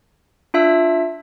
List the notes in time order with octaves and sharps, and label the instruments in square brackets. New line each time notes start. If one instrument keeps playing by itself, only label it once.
[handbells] D4 F4 E5 E6